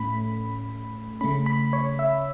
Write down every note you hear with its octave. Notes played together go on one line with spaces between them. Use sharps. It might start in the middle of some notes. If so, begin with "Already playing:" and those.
Already playing: A2 A3 C#4 B5
C#3 A3 C#4 B5
B5
C#5
E5